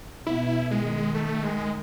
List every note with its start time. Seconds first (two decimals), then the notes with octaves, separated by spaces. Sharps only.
0.27 B2 E4
0.71 D#3 G#3
1.14 A3
1.43 G#3